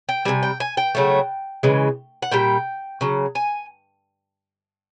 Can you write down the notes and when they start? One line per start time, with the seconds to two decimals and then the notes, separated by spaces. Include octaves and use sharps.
0.09 G5
0.25 C3 D#3 G3 G#5
0.43 G5
0.60 G#5
0.77 G5
0.95 C#3 F#3 A3
1.63 C#3 E3 G#3
2.22 F#5
2.32 A#2 G3 G5
3.01 C#3 F#3
3.35 G#5